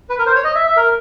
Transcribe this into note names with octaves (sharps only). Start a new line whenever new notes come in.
B4
A#4
C5
C#5
D#5
E5
E5
A#4